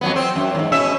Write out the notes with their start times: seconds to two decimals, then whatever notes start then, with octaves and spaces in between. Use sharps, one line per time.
0.01 F2 F#3 B3
0.16 C4
0.36 F#2
0.55 E2 G#2
0.72 B2 C#4 E5